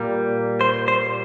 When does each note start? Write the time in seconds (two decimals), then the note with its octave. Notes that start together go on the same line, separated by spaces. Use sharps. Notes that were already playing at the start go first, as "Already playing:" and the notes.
Already playing: A#2 G3 A#3
0.61 C5
0.88 C5